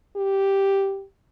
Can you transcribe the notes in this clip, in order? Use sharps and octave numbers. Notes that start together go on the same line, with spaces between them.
G4